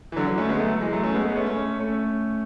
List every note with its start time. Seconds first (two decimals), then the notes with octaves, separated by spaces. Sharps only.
0.12 E3
0.16 D3 F#3
0.27 D3 F#3
0.38 A3 C#4
0.49 G#3 B3
0.60 F#3 A3
0.81 E3 G#3
0.93 F#3 A3
1.03 A3 C#4
1.14 G#3 B3
1.25 G#3 B3
1.36 A3 C#4
1.46 A3 C#4
1.79 A3 C#4